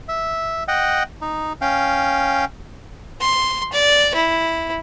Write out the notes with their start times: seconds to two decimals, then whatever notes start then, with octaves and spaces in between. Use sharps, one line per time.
0.08 E5
0.68 D#5 F#5 G5
1.22 D#4
1.61 C#4 F5 G5
3.20 C6
3.73 D5
4.15 E4